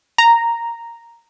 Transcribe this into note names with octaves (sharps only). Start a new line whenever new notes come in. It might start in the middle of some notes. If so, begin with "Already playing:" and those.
A#5